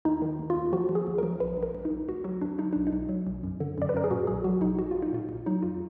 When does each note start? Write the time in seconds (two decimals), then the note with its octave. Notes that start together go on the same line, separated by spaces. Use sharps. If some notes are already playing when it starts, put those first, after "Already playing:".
0.05 D#2 D#4
0.22 D#3
0.39 D#2
0.50 F4
0.56 D#2
0.73 F3 F#4
0.89 F3
0.95 G#4
1.07 D#2
1.18 A#4
1.23 F3
1.40 A#1 B4
1.57 A#1
1.63 A#4
1.75 A#1
1.85 D#4
1.90 A#1
2.08 D2 F#4
2.24 F#3 F#4
2.41 D2 D4
2.58 F#3 D#4
2.73 B1 D4
2.87 D#4
2.93 B1
3.09 F#3
3.27 B1
3.43 F#2
3.60 D3
3.78 F#2 D5
3.89 B4
3.94 F#2 A#4
4.04 G#4
4.10 A#2 F#4
4.27 B1 G#4
4.44 F#3 F#4
4.61 B1 D#4
4.79 A#1 F#4
4.91 A#1 F4
5.02 D#4
5.13 A#2 F4
5.29 A#1
5.46 F#3 D#4
5.63 F2 F4